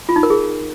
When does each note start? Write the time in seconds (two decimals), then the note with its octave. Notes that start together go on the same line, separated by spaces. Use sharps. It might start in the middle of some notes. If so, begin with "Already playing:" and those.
0.09 F4
0.16 D#4
0.23 A#4
0.30 G#4